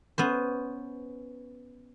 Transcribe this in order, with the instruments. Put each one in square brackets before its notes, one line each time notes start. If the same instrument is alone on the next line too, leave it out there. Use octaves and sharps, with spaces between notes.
[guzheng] B3 C#4 C5